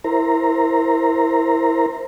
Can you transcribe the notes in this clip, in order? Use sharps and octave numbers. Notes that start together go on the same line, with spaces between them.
E4 A#4 C5 A#5